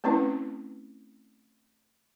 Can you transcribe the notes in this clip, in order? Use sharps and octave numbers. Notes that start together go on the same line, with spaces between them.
A3 C4 C#4 E4 B4